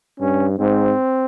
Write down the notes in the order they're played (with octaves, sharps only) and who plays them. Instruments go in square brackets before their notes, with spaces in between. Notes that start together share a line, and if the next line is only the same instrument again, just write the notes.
[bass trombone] G2 [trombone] C#4
[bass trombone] G#2 [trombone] C4